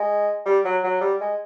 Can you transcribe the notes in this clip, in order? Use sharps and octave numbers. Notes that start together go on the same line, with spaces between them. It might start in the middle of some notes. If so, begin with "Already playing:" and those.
Already playing: G#3
G3
F#3
F#3
G3
G#3